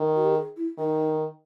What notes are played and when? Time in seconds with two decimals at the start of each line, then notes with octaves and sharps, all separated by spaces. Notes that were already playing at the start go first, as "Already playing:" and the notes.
Already playing: D#3
0.16 F#4
0.25 G4
0.35 G#4
0.57 E4
0.78 D#3 D#4